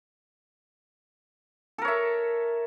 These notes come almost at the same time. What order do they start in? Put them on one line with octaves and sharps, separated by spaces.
A4 A#4 C#5 E5